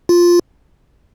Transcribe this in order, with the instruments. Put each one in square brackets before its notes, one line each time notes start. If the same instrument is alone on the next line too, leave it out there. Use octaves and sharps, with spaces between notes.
[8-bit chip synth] F4